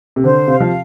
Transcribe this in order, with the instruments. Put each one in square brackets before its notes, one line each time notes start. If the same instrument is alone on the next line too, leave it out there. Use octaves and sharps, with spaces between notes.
[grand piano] C3
[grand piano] D3 [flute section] C5
[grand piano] C3 [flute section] F5
[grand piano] F3